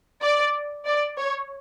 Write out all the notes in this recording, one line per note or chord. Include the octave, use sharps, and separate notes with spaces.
D5
D5
C#5